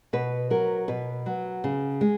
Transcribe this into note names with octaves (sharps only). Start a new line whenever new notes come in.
B2 B4
F#3 A#4
B2 B4
F#3
C#3
G#3